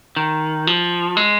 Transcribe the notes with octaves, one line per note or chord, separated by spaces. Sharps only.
D#3
F3
G#3